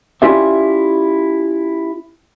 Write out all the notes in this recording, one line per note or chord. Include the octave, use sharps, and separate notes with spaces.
C#4 E4 F4 G4 D5 E5